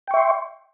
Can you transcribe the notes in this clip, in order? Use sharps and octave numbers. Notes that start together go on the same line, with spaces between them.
E5 G5 C6 C#6